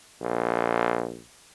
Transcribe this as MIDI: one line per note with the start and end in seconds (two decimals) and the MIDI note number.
0.21 1.20 34